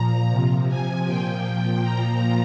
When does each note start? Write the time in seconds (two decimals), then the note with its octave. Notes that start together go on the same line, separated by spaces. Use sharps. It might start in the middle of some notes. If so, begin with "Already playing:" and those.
Already playing: A#2 F3 A#5
0.30 C3 F3
0.67 C3 F3 G#5
1.06 A#2 F3 G5
1.45 A#2 F3 G5
1.82 A#2 F3 A#5